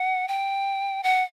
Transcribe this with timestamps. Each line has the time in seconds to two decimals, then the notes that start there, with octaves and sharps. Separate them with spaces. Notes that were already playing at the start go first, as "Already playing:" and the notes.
Already playing: F#5
0.28 G5
1.03 F#5